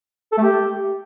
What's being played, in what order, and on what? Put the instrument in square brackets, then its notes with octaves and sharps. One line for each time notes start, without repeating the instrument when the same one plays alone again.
[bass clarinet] A4
A3
G4